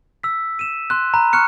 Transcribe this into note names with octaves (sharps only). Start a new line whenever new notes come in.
E6 B6
D#7 E7
C6 F#6
A#5 B5 F#6
C#6 F6 F#6 C#7